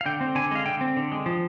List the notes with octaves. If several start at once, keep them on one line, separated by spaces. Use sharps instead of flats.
F5
D3 G5
C4
D3 G#5
G#3 F5
D3 G5
C4
D3
G#3
F3